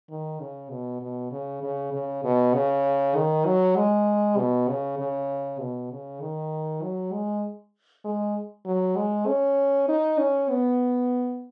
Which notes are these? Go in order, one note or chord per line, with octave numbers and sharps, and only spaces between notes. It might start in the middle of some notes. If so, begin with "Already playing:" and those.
D#3
C#3
B2
B2
C#3
C#3
C#3
B2
C#3
D#3
F#3
G#3
B2
C#3
C#3
B2
C#3
D#3
F#3
G#3
G#3
F#3
G#3
C#4
D#4
C#4
B3